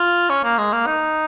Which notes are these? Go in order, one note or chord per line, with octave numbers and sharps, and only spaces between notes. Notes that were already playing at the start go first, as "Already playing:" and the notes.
Already playing: F4
C#4
A#3
G#3
A#3
D#4